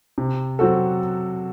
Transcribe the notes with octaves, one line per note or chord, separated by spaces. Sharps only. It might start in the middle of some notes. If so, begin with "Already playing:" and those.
C3
F#3 C4 F#4 A4